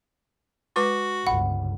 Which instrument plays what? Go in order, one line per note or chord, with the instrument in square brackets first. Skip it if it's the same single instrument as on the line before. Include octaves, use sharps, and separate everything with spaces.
[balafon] G#3 B4 D6 [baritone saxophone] F#4
[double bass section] G1 C#2 [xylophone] F#5 [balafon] B5